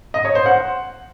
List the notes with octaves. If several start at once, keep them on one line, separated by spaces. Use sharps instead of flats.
D#5
C#5
C5
F#5